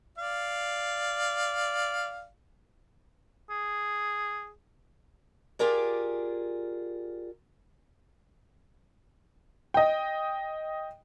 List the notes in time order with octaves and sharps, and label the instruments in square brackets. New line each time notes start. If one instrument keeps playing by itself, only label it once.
[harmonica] D5 F5
[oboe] G#4
[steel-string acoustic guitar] F4 G4 G#4 A#4 D5
[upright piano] D#5 G5